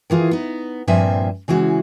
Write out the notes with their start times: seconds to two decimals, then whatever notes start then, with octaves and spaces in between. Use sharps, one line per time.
0.10 D#3 E3 F4 G#4
0.31 B3 D#4
0.87 G2 A#2 F3 C4 E5 G#5
1.48 C#3 E3 G#3 F#4